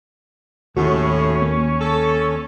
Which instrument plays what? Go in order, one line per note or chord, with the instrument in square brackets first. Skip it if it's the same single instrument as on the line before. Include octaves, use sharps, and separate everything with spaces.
[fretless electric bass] D#2 [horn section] A2 [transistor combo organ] C#4 [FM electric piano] F#4
[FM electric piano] A#3
[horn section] A4